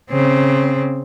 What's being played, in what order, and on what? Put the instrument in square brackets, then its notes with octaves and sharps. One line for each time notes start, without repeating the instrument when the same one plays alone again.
[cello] C#3 C4